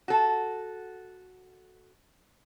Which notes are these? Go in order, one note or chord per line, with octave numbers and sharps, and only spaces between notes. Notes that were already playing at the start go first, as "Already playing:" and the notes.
F#4 A4